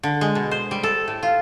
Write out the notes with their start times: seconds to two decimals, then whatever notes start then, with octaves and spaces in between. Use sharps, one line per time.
0.03 D3
0.21 G#3
0.35 B2
0.51 C5
0.71 G3
0.83 A4
1.08 A2
1.23 F4